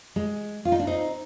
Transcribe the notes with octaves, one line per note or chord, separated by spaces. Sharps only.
G#3
F4
D#4
D4
C4 D#4